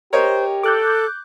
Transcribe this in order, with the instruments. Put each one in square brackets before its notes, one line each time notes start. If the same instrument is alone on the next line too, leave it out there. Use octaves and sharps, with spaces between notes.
[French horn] G4 [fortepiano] A#4 C#5 D#5 [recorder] C5
[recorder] A4 [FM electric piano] D6 F#6 G6